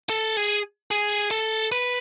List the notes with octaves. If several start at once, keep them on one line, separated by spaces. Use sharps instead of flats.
A4
G#4
G#4
A4
B4